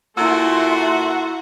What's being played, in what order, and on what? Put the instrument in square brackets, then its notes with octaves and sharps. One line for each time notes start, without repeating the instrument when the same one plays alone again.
[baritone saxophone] A#2 [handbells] E4 E6 [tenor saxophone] F#4 [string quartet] A4 E5 C6